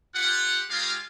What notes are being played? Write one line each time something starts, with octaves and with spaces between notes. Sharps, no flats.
F4 G4 F#5
G#3 F4 G4 G#4 A#4 F5